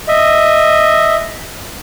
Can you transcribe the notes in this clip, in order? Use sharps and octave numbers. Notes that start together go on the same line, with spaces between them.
D#5 E5